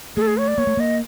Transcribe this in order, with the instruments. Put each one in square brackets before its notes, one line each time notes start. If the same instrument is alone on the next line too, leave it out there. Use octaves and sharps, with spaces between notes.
[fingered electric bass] A3 [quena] G#4 A4
[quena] G#4
C#5
D5
[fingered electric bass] A#3 [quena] C#5
[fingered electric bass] A3
[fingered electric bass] A#3 [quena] D#5